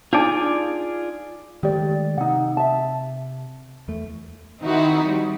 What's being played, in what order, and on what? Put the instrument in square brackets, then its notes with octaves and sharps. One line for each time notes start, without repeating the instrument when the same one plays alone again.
[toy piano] D4 D#4 A5 [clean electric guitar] F4 G#4 D5
[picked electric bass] D#3 G#3 A3 [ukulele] G4 D5
[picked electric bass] C3 [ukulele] D#4 F#5
[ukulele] E5 A5
[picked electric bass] E2 A3
[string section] D#3 C4 D#4 E4 F#4
G3